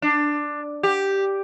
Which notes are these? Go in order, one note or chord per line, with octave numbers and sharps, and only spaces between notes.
D4
G4